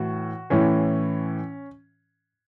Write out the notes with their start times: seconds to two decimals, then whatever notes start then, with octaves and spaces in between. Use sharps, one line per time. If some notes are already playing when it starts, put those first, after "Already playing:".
Already playing: A2 E3 F#4
0.50 A2 E3 C#4